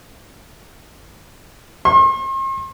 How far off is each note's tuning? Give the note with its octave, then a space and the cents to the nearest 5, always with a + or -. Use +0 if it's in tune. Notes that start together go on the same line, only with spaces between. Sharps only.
C6 +45